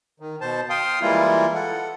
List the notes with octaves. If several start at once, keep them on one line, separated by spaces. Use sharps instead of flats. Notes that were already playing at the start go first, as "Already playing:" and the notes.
D#3
B2 C5 A5
F5 G5 C6 D#6
E3 G3 G#3 A#3 E4 F4
A4 F#5